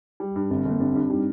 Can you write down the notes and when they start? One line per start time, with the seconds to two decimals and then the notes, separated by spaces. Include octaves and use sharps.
0.20 G3
0.36 G2
0.50 G1 C4
0.65 G1
0.71 A#3
0.80 G2 C4
0.95 G2 D4
1.10 G3 D#4